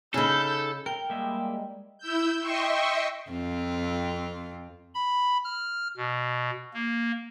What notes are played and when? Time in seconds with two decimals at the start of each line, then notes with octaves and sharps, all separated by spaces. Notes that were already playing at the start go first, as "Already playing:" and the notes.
0.14 C#3 D#4 E4 G#4 A4 G6
0.86 A#4 G5
1.10 G3 G#3 A#3 E5
1.98 E4 E6 G6
2.40 D#5 E5 G5 C6 C#6
3.30 F2 C4 F4
4.94 B5
5.44 F6
5.97 B2
6.74 A#3